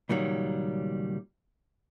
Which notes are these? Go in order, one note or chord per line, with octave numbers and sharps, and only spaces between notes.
C#2 A#2 D#3 F#3 G3